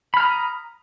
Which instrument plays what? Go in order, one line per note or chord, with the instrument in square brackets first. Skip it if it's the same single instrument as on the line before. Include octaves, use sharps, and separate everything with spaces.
[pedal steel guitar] B5
F6
A#5
D#6